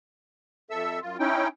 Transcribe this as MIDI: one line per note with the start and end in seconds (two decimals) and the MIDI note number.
0.70 1.00 41
0.70 1.00 69
0.70 1.00 76
0.70 1.00 88
1.02 1.17 42
1.02 1.17 65
1.19 1.48 61
1.19 1.48 63
1.19 1.48 64
1.19 1.48 79